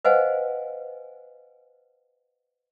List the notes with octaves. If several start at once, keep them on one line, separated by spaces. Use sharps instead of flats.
B4 C5 D#5 F5 F#5 G#5